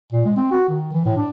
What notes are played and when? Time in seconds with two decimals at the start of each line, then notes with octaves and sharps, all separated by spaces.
0.12 A#2
0.25 G#3
0.36 C4
0.52 F#4
0.69 D#3
0.93 E3
1.06 A2
1.17 D4